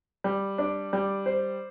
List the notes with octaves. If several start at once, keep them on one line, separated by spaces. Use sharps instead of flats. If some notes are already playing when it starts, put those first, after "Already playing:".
G3
D4
G3
C5